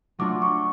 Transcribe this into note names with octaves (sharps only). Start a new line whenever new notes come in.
F#3 A3 D4 F4 D6
C#6